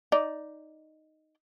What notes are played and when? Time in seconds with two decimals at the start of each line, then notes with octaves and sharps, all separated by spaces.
0.12 D#4 D5